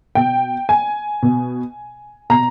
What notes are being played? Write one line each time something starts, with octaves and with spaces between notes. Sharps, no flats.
B2 G5
G#5
B2
B2 A#5